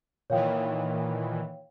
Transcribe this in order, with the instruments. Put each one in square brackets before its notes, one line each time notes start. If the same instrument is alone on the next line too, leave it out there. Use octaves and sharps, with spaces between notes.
[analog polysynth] A#2 D#3 E3 [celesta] C#5 F5 G5